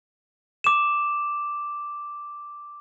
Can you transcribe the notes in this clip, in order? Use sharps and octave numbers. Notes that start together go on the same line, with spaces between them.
D6 E7